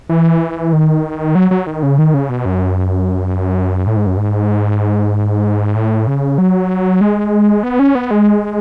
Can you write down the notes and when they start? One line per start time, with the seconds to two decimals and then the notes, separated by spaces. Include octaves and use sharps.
0.09 E3
0.73 D#3
1.35 F#3
1.51 F#3
1.67 D#3
1.83 C#3
1.98 D#3
2.14 C#3
2.29 B2
2.45 F#2
3.87 A2
3.97 G#2
4.07 F#2
4.17 G#2
5.75 A2
6.07 C#3
6.38 F#3
7.01 G#3
7.63 B3
7.79 C#4
7.95 B3
8.11 G#3